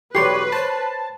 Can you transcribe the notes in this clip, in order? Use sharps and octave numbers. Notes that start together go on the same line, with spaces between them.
B1 E2 G4 B4 C#5 D5 C6 C7
C5 C#5 A5